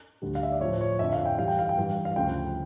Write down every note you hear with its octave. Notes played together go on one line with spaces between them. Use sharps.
D2 D3 G3
F5
E5
D5
A2 F3 C#5
C#5
F2 D3 F3 E5
F5
G5
G2 E3 G3 F5
G5
F5
G5
G2 E3 G3 F5
F5
D2 C#3 F3 G5